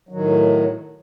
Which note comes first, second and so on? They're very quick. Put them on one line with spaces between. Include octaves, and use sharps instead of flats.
F#3 D#3 A2